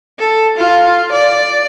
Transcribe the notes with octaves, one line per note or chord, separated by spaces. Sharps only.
A4
F4
D5